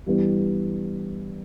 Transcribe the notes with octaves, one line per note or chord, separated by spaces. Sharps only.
G2 E3 G3 B3